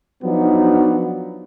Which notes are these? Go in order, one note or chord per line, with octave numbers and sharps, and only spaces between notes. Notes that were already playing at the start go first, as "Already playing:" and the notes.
F3 F#3 B3 D4 D#4